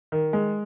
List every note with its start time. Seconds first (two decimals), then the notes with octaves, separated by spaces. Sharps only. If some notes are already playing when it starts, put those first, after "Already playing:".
0.12 D#3
0.33 G#3